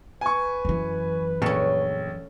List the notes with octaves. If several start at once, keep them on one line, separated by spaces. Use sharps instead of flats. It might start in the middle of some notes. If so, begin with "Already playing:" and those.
B4 G#5 C#6
F#2 E3
A#1 A3 C#4